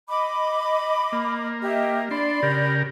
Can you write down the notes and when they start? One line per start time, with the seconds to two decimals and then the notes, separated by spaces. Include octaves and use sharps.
0.08 D#5 B5 D6
1.12 A#3
1.62 G4 D#5 E5
2.11 D4 D5 B5 C6
2.43 C#3 G4 A#4